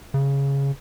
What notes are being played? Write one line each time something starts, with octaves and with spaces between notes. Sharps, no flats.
C#3